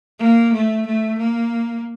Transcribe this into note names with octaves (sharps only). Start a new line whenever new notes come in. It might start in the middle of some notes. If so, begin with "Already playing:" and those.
A#3
A3
A3
A#3